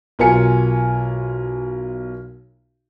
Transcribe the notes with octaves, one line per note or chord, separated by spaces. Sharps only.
B1 F4 A#4 G#5 C#7